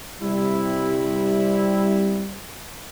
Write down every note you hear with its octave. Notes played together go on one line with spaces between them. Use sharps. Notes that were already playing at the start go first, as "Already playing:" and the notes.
C3 G3 E4